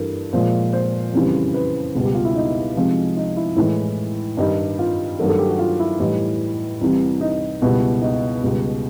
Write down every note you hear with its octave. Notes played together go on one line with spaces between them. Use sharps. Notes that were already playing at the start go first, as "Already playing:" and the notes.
Already playing: G2 E3 A3 A#4
A#2 F3 G#3 C5
C5
F2 C#3 E3 G3
B4
C#2 B2 G3
G4
F4
E4
D#4
C2 C3 F3 G#3
D#4
E4
A2 E3 G#3
G2 D#3 G3 D#4
F4
G2 D#3 F#3 A3 A#4
A4
G4
F#4
F4
E4
A2 E3 G3 D#4
C2 C3 E3 G3
D#4
C#2 B2 G3 E4
D#4
C#2 B2 G3